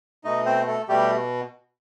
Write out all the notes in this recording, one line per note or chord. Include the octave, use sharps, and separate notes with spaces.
B2 A3 D#4 D#5
C4 C5
A3 A4
B2 G3 A3 G4